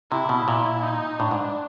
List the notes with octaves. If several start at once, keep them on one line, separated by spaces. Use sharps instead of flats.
C3 E4
B2
A#2
D#4
A2 D4
G#2